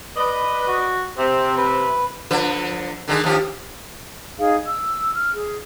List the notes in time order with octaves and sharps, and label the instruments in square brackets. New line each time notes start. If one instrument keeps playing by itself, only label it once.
[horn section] B4 D5 D#5
[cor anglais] F#4
[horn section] C3 [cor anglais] C4
[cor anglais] B4
[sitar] D3 F3 B4
D3 D#3 G#3
D#2 F3 G4
[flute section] D#4 G#4 F5
E6
F6
G#4